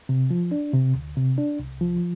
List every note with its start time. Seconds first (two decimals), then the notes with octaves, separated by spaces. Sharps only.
0.09 C3
0.31 F3
0.52 D4
0.73 C3
0.95 D2
1.17 C3
1.38 D4
1.59 C2
1.81 F3